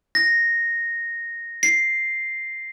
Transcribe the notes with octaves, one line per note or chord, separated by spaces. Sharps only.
A#6
C7